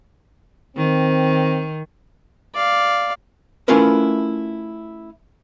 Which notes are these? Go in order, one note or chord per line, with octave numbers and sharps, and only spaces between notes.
D#3 C4
D5 F5
A3 C#4 E4 F4 A#4 B4